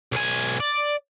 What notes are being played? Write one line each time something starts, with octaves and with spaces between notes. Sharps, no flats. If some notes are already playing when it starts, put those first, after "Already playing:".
B1 G#5
D5